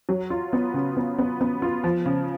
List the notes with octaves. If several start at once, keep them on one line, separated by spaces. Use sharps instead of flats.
F#3
F4
B3
C#3
B3
B3
B3
F4
F3
C#3